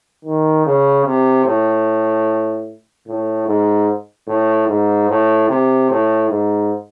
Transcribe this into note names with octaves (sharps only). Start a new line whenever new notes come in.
D#3
C#3
C3
A2
A2
G#2
A2
G#2
A2
C3
A2
G#2